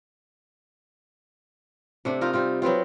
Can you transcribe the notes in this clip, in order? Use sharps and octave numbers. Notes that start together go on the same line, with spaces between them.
C3 A3 D4
D#4 F4 A#4
G3 C4 F4
F#3 B3 C4 F4